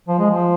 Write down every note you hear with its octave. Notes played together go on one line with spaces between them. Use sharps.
F3
G#3
F3